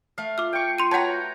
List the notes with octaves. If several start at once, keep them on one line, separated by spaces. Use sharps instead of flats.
A3 F5
F4 D6 F6
G5 C#6
C6 D#7
F#4 B4 C#5 F#5 G5 A5 A#5